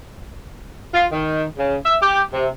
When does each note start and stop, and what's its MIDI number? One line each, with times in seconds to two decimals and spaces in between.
0.94 1.05 65
1.12 1.44 51
1.58 1.75 49
1.85 1.96 76
2.01 2.21 67
2.33 2.47 48